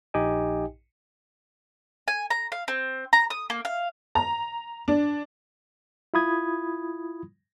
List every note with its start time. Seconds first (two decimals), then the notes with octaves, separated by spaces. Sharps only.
0.14 A#1 D#4 G4 D#5 G5 G#5
2.08 G#5
2.30 A#5
2.52 F5
2.68 C4
3.13 A#5
3.30 D#6
3.50 A#3
3.65 F5
4.15 A#5
4.88 D4
6.14 E4 F4 B5 D#6 G#6